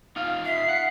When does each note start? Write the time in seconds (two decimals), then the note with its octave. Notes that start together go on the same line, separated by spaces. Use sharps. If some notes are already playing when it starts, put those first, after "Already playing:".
0.16 D#4 F4 F5 F6
0.45 E5 C7
0.69 F#5